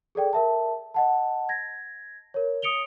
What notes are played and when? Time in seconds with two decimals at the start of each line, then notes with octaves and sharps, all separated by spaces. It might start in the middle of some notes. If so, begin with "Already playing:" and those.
0.15 G#4 A4 D5 G5
0.33 A#4 E5 A5
0.94 D#5 F#5 A5
1.49 G#6 A#6
2.34 A#4 C#5
2.62 D#6 C#7 D7 F7 G7